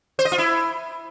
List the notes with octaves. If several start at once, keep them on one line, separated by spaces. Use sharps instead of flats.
C5
D#5
F4
E4